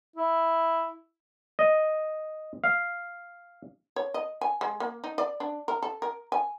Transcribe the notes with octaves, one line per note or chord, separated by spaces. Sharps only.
E4
D#5
F5
C#5
D#5
G#5
G#3
A#3
D#4
D5
D4
A#4
A4
A#4
G#5